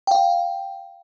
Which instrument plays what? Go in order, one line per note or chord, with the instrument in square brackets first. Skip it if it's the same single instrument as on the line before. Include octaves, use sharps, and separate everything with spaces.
[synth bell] F5 G5